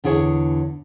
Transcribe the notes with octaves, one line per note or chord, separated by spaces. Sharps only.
E2 D3 E4 G#4 C#5